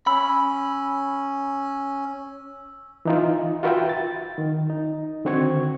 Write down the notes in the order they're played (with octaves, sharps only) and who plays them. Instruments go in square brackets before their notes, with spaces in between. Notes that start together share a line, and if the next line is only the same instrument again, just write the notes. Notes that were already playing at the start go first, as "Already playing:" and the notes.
[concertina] C#4 [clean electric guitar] B5 [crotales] E6
[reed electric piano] E3 D#4 F4
F4 F#4 A#4 B4 E5 G5
A6
D#3
D#4
D3 D#3 C4 F#4 C#6 G#6